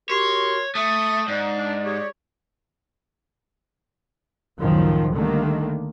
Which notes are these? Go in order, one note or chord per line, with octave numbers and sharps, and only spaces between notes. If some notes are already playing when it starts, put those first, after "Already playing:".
F#4 G4 A#4 C#5 C6
A3 E5 D#6
G#2 D5
D4
G4 G#4 C#5
C#2 F#2 A2 D#3 F3 F#3
D3 D#3 G3 A3 A#3